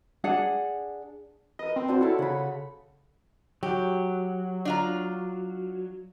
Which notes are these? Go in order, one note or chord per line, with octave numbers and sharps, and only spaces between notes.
D4 G#4 F#5
A#4 B4 D#5
C4
D4 F#4 C5
E4 A4 C#5 F5
C#3 F#5 B5
F#3 G4
D4 F4 A#5